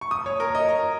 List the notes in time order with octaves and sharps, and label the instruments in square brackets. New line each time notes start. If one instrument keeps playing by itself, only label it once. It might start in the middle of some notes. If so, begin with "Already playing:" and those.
[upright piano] C#6
D#6
C#5
A#4
D#5
A#5